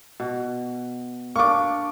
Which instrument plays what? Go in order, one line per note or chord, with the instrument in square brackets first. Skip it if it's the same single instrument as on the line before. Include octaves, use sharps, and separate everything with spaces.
[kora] B2
[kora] A#3 D4 [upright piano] C#6 D6